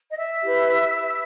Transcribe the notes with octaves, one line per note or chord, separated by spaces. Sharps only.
D#5
E5
E4 G4 B4